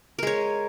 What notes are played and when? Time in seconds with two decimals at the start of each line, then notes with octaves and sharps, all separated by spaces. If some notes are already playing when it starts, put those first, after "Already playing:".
0.19 A#4
0.23 G#3
0.27 C#5